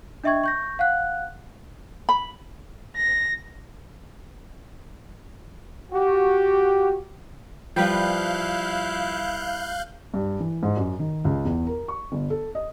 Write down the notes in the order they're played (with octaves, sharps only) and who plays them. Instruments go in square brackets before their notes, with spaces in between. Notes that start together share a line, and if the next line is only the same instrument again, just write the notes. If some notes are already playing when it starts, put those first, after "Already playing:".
[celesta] D4 D#5 E5 G5 C#6 G#6
C#6 G6 A#6
F5 F#5 F#6
[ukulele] B5
[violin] A#6
[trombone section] F#4 G4
[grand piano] F3 [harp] G3 B4 G5 [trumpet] E4 [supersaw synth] F5 F#6 G6
[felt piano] G2
E3
G#2
F#2
D#3
C#2
E2
A#4
C#6
G1
A4
D#5